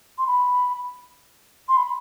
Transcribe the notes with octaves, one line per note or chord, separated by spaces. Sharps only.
C6
B5
C6
B5